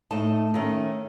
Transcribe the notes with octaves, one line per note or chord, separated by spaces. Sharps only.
A2 A3 D#4 A5
D#3 A3 C#4